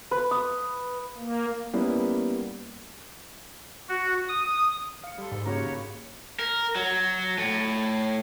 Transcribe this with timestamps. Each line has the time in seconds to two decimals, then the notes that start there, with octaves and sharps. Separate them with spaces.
0.11 B4
0.31 D#6
1.18 A#3
1.73 G3 A#3 B3 C#4 E4
3.89 F#4
4.28 D#6
5.04 F5 C#7
5.18 G3 A4 C6
5.32 G#2
5.45 C#3 A#3 F#4 G4 C#5 A#5 B5
6.39 A#4
6.75 F#3
7.38 A2